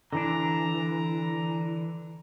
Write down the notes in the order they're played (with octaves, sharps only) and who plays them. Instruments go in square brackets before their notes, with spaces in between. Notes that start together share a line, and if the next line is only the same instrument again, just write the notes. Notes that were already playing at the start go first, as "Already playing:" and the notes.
[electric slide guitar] D3 E3 D4 [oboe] A#5